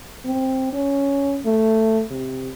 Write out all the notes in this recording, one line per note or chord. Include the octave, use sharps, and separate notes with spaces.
C4
C#4
A3
C3